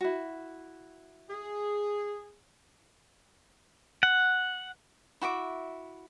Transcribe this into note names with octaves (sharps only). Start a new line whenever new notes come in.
E4 F#4
G#4
F#5
E4 F#4 E5 D6